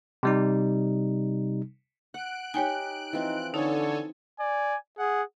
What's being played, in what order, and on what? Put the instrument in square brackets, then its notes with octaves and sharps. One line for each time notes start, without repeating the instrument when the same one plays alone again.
[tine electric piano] C3 G3 D#4
[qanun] F#5 [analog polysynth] F#6 D7
[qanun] D#4 G4 [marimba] C#5 G5 G#5
[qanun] E3 F3 C4 [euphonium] D#4
[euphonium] D3 [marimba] D#4 [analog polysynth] A4 C#5 G#5
[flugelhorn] D5 [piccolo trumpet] G#5
[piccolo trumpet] G#4 [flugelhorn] F#5